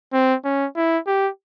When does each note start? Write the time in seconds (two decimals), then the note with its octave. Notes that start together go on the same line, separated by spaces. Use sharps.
0.13 C4
0.45 C#4
0.76 E4
1.07 G4